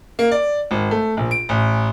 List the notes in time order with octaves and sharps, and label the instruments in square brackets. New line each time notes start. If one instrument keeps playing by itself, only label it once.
[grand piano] A#3
D5
G#1
A3
A#1
D7
A1